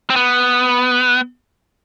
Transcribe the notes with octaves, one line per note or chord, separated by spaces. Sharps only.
C4
B3